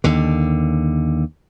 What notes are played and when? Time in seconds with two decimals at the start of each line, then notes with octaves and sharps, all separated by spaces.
0.04 D#2 D3